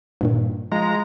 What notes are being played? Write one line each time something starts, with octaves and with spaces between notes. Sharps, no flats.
G2 A#2 D#3
F3 G#3 A#5